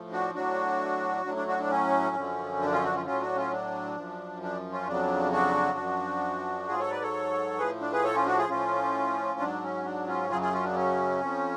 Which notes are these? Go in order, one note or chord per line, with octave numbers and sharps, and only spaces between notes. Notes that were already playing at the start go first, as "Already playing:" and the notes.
Already playing: A2 F3
D4 F#4
A2 F#3 D4 F#4
A2 F#3 D4
D4
D4 F#4
D4
C#4
F#2 D3 F3
D4
C#4 F4
D4 F#4
C#4 F4
A2 F#3 C#4 F4
D4 F#4
C#4 F4
D4
F#2 F3
D4
C#4 F4
F2 C#3 F#3 D4
D4 F#4
F#2 F3
G#2 F#3 F4 G#4
A4 C#5
B4 D5
A4 C#5
A2 F3 G#4 B4
D4
G#4 B4
A4 C#5
C#4 F4
D4 F#4
F4 G#4
A2 F3 C#4 F4
G#2 F#3 D4
C#4
D4
C#4 F4
F#2 C#3 F#3 F4 G#4
F4 G#4
C#4 F4
D4
C#4
F2 F3